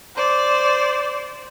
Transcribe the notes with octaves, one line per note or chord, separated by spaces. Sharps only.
C5 D5